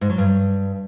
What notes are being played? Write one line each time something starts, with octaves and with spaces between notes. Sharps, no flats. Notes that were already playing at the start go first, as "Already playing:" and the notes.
G#2
F#3
G2